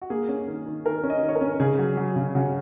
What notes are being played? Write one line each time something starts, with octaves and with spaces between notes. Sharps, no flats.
F#4
A#3 G#4
C#4
D#3
D#3
D#3 A#4
C#4
D#5
D#3
C#5
A#4
C#4
C#3 G#4
F#3
F#3
C#3
C#3 F#4